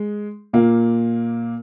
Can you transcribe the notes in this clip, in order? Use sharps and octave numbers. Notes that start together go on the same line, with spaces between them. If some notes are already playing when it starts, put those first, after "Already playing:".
Already playing: G#3
A#2 A#3